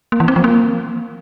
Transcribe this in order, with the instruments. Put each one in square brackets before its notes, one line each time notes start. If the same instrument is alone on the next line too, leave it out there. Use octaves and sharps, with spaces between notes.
[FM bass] A#3
E3
C4
F3
A#3